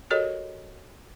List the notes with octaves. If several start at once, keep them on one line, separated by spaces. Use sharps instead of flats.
F#4 G4 A4 A#4 C#5 D#5